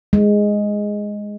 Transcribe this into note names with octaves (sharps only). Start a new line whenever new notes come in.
G#3